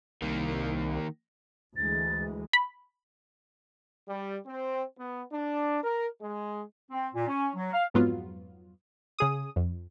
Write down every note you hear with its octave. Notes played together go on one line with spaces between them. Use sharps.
C2 D#3 A#3
D2 E3 G#3 A6
B5
G3
C4
B3
D4
A#4
G#3
C4
A#2
C#4
F#3
F5
F2 G#2 F#3 B3 F4
C#3 G#4 D#6
F2